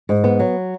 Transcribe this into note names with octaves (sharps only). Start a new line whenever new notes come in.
G#2
B3
F#3